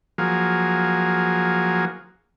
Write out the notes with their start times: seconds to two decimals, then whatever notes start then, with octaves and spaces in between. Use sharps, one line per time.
0.18 F3 F#3 A#3 G#4